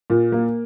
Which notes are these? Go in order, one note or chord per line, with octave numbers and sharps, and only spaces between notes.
A#2
A#3